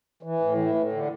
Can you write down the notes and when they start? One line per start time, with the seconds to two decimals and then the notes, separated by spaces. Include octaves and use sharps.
0.23 E3
0.40 A2
0.57 E3
0.75 A2
0.92 D3